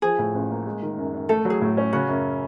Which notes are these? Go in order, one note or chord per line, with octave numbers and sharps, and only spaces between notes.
F3 G#4
A2
A1
A#3
G#3
D#3
F#2
F#2
A3 A4
F#3
G#4
A2
C#4
C#3 F#4
F#2